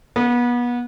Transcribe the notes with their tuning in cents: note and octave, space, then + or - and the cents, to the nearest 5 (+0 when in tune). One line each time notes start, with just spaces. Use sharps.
B3 -30